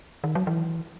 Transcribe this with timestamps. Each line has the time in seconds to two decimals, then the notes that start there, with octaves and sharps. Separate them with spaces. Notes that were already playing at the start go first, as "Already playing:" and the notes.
0.24 D#3
0.35 F#3
0.47 E3